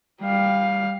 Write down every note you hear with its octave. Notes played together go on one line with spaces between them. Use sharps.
G3 F5